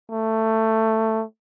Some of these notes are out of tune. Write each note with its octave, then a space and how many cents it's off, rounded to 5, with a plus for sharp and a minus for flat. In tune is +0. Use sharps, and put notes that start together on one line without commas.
A3 +15